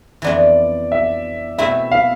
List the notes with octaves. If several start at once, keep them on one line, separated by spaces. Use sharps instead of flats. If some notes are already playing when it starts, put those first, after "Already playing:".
F2 E3 B3 D4 D5
E5
B2 A3 C4 E4 E5
F5